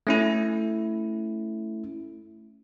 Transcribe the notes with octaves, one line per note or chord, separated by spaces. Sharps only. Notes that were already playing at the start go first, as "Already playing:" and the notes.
A3 C#4 E4